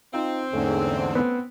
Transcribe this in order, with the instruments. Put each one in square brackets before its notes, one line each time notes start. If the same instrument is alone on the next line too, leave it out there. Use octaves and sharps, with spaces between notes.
[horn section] C4 [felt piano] D#4 F4
[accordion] E2 G#2 D3 [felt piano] A3 C#4
[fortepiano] B3